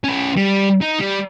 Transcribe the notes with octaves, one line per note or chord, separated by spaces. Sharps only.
C#4 B4
G3
D#4
G3